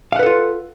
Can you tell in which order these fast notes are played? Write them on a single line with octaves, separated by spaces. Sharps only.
F5 F#5 B4 A4 F4